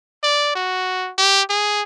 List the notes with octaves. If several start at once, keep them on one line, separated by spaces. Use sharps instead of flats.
D5
F#4
G4
G#4